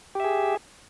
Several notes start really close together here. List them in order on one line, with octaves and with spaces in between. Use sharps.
G4 E5 G#4